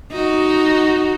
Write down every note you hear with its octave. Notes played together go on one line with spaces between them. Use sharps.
D#4 F#4